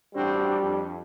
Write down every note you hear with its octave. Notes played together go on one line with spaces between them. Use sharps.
A1 G3 C4 D4 F#4
F2